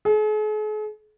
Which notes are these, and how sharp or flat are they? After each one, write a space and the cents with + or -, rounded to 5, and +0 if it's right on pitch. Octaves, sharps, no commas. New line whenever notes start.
G#4 +45